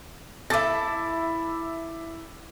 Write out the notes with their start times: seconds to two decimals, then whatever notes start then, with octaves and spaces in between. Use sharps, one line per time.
0.50 E4 A4 E5 D6 A6